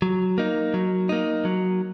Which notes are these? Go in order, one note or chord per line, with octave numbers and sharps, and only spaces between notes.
F#3
A#3 D#4
F#3
A#3 D#4
F#3